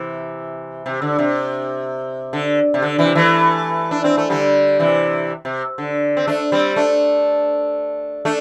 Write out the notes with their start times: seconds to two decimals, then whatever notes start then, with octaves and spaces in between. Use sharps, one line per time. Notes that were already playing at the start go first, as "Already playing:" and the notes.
Already playing: C3 E3
0.86 C3
1.02 D3
1.19 C3
2.33 D3
2.74 C3
2.82 D3
2.99 C3 E3
3.15 E3 A3
3.91 D4
4.04 C4
4.17 A3
4.30 D3 G3
4.79 C3 E3
5.45 C3
5.78 D3
6.17 C4
6.28 A3 D4
6.52 G3 C4
6.76 A3 D4
8.25 A3 D4